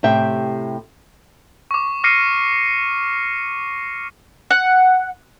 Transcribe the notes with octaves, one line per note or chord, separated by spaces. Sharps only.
A2 C3 G4 E5 G5
C#6 D6
D6 F6 A#6 C7 C#7 D#7
F#5